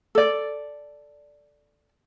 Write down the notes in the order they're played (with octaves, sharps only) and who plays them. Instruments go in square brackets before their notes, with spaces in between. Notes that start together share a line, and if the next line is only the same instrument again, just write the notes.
[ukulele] A4 D5